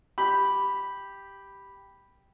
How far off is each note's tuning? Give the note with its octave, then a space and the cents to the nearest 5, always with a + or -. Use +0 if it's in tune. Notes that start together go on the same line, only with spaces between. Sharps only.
G4 +0 B5 +0